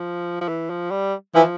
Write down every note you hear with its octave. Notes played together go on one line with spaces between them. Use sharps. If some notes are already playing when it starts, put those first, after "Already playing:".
Already playing: F3
F3
E3
F3
G3
E3 F3